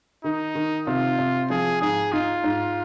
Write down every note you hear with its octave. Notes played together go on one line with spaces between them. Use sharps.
D#3 D#4
D#3
C3 F4
C3
F3 G#4
G#2 G#4
D#4 F4
G#2